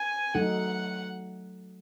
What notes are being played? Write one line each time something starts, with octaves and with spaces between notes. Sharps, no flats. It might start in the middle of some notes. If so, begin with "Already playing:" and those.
Already playing: G#5
F#3 A3 D#4 A4 F#5